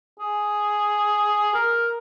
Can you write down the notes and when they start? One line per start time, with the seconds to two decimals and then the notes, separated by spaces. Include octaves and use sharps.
0.20 G#4
1.54 A#4